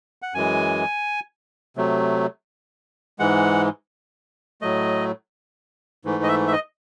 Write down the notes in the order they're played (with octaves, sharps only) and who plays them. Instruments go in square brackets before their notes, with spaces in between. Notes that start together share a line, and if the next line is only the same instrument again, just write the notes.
[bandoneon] F#5
F#2 E3 G#3 G#5
C3 F#3 A3
G#2 E3 G#3 F#5
A2 F#3 A3 D#5
G#2 E3 A3
D#5
E5
E5
D#5